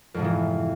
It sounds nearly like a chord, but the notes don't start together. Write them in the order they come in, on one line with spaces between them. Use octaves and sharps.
F2 G#2 C3 F3 E3